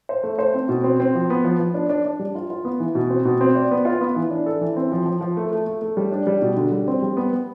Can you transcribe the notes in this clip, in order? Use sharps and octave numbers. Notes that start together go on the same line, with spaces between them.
C5
A3
C5
C4
B2
C4
C4
F3
B3
F3
F3
D4
D4
D4
G3
F4
F4
B3
E3
B2
C4
B2
C4
D5
B3
F4
B3
E3
D4
A4
E3
C4
F3
F3
F3
A3
A3
A3
A3
G3
D4
G3
B2
D3
G3
C4
G3
B3
B3